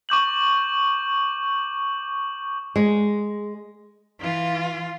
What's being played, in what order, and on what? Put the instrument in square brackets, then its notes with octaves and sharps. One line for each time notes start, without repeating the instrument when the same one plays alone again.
[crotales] C#6 D6 G6 F#7
[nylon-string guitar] G#3
[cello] E3 F4